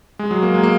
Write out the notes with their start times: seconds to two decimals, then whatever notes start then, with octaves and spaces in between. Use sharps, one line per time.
0.19 G#3
0.31 F#3
0.43 A#3
0.54 G#3
0.63 A#3